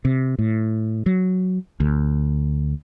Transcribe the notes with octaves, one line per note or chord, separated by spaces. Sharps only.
C3
A2
F#3
D2